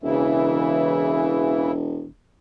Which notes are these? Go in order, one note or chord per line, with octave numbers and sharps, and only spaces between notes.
E1 C#3 E3 E4